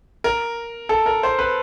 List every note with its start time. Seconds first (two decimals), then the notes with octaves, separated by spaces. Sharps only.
0.24 A#4
0.89 A4
1.06 A#4
1.23 C5
1.39 B4